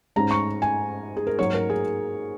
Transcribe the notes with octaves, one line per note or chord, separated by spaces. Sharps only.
G#2 G#3 C#4 A#5
C#6
G#5
G#4
A#4
G#2 F#3 A#3 C#5
A#4
G#4